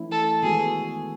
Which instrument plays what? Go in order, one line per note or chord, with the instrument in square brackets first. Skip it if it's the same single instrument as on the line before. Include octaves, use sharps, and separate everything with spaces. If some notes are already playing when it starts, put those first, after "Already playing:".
Already playing: [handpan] E3 A3 C#4 E4
[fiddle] A4
[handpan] D#3 G#3 B3 F#4 A4 [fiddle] G#4